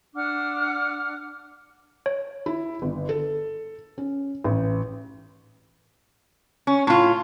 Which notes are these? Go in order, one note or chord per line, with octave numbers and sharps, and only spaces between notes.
D4 F#5 D6 F6
C#5
E4
G1
A4
C#4
A1
C#4
A2 F4